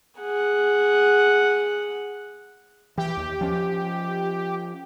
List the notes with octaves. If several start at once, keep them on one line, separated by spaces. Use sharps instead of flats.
G#4 F#5
E3 G4
D#2
F3 C#4